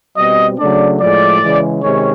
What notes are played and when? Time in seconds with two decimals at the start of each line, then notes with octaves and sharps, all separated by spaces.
0.17 B2 G3 C4 D#5
0.58 C#3 F#3 A3 D4 D5
1.01 A2 F3 G#3 D5
1.42 C#3 E3 G#3
1.83 C3 D#3 G#3 C#4 C#5